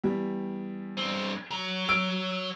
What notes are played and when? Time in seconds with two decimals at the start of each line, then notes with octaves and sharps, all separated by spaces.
0.04 E2 G3
0.97 G2 C4
1.51 F#3 A#5
1.89 E6 D7